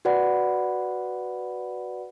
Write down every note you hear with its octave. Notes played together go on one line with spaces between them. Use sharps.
F#4 B4 D5 F#5 B5